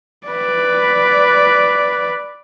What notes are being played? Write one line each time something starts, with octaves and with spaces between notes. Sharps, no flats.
B4 D5